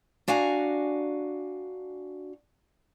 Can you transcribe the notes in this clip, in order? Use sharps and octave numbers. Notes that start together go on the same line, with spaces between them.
D4 F#4 F5 G#5 A#5